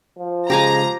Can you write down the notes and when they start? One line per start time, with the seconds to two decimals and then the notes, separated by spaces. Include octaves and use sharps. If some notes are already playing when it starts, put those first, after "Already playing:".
0.19 F3
0.50 C#3 G#3 G4 F5 G#5 A#5